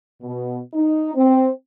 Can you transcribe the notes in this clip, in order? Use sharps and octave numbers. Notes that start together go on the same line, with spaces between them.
B2
D#4
C4